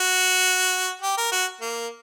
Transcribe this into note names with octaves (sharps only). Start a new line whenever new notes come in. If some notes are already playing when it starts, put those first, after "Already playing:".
Already playing: F#4
G4
A#4
F#4
A#3